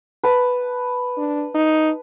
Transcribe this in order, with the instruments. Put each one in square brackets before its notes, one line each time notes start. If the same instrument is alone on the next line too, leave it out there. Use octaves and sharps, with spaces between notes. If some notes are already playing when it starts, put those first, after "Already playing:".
[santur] B4 A5
[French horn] D4
D#4